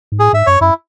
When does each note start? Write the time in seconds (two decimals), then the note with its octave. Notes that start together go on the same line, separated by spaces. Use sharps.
0.12 G#2
0.19 A2 G#4
0.33 G#2 E5
0.47 F#2 C#5
0.61 F#2 E4